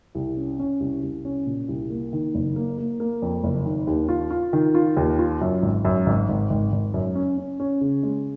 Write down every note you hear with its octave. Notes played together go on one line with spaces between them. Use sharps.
C2
C#4
C#4
C2
C2
C#4
A#2
C2
A#3
D#3
F#1
A#3
A#3
A#3
F2
F#1
D#3
D#2
F4
F4
D#3
F4
D#2
F4
F#2
G#1
F#2
G#1
G#1
G#1
G#1
F#2
C#4
C#4
C#4
C#3
G#3